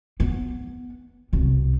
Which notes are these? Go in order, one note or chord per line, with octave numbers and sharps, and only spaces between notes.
B3
C2 B2